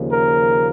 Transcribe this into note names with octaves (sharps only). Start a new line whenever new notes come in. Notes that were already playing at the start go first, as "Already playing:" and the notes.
Already playing: D#2 C#3 F3 A#3
A#4